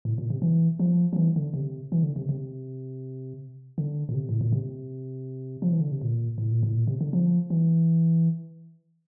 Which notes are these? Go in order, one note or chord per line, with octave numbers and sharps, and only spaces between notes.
A2
A#2
C3
E3
F3
F3
E3
D3
C3
E3
D3
C3
C3
D3
A#2
C3
A2
A#2
C3
F3
E3
D3
C3
A#2
A2
A#2
A2
A#2
C3
D3
F3
E3